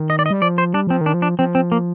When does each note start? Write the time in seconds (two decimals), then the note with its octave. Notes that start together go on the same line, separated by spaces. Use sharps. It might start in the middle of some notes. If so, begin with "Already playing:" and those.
Already playing: D#3
0.10 D#5
0.19 D5
0.26 D#5
0.31 G3
0.42 F3 D5
0.58 C5
0.73 G3 D4
0.87 F3 C4
1.01 D#3
1.06 D4
1.14 F3
1.22 D4
1.39 F3 C4
1.55 C4
1.72 A#3